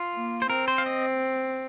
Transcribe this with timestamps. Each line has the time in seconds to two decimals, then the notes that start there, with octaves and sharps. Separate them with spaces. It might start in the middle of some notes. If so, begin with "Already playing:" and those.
Already playing: F4
0.14 A#3
0.42 C5
0.49 C4 A#4
0.68 C5
0.78 F5
0.86 D#5